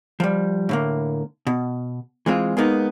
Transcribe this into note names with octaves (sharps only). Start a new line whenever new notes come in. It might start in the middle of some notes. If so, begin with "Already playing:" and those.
F3 G3
A2 D3 A#3
B2
E3 G#3 C4 F4
G#3 A#3 B3 D#4